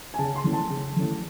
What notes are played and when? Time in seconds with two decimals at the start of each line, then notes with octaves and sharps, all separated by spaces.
0.14 G#5
0.19 C#3 A5
0.36 C6
0.44 E3 A3 C#4
0.53 A5
0.70 C#3
0.96 E3 A3 C#4